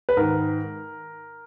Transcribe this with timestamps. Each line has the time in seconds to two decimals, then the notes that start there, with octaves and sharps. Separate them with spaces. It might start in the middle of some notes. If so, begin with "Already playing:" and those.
0.09 B4
0.17 G#2 D#3 A#4